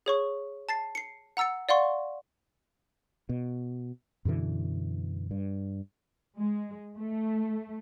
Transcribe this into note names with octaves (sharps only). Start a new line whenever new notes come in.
G#4 C#5 C#6
A5 A6 C7
C7 C#7
F#5 A#5 E6 A6 C#7
D5 F5 F#5 C6 C#6
B2
F#2 B2 D3 E3
G2
G#3
A3